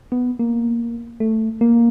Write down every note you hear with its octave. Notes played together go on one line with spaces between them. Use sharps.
B3
A#3
A3
A#3